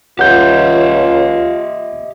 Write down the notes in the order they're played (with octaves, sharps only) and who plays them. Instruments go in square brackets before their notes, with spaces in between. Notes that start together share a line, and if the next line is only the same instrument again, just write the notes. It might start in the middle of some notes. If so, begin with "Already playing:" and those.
[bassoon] C#2 [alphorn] F4 [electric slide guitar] G4 D#5 E5 [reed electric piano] F#5 G6